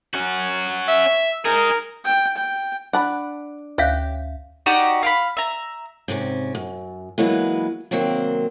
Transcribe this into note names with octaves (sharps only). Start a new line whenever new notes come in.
C#4 F#4
E5
D#4 G#4 A#4
G5
G5
D4 F#5 A5 B5
D2 G4 C#5 E5 F5 F#6
D#4 F#4 G4 D5
F5 G5 B5
E5 A#5
G#2 C3 C4 C#4
F#2
E3 F#3 G#3 A#3 B3 B4
C3 D#3 F#3 A#3 C4